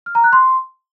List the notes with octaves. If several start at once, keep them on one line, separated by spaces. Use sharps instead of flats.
F6
A#5
F#6
C6